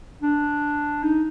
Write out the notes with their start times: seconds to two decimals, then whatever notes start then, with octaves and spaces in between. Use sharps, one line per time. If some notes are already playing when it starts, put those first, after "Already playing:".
0.22 D4
1.03 D#4